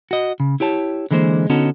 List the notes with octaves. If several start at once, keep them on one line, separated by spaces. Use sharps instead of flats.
F#4 D#5
C#3
E4 G4 C#5 A5
D3 E3 G#3 A#3 C5
D3 B3 C#4 D#4 F#4 A4